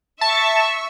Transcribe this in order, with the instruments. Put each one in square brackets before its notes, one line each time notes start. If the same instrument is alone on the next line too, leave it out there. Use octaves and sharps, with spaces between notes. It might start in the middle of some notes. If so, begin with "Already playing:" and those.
[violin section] E5 C#6 [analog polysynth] A5